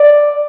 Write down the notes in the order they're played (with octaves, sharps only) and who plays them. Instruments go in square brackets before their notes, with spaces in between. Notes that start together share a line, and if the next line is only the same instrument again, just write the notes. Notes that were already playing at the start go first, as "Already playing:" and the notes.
Already playing: [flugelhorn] D5